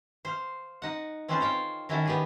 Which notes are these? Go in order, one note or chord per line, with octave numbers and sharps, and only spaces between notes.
C5 F5
D#4 F#5
C4 C#4 F4 A4 B4 C5
C5 C#5 F5 G5
D#3 C#4 E4 F#4 A4
B3 G4 G#4